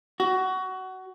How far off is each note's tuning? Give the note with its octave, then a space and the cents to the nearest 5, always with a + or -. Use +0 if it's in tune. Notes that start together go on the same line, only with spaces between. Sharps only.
F#4 +20